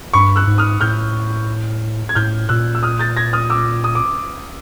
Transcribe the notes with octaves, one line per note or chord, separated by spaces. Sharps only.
G2 B5 C#6
E6 F#6
G#2
D#6 F6
A2 F6 G6
G#6
A2 F6 G6
A#2 E6 F#6
E6
D#6 F6
G6 A6
G#6 A#6
D#6 F6
D6 E6
D#6
D6